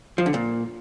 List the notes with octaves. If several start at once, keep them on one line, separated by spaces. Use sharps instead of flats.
F3
D3
A#2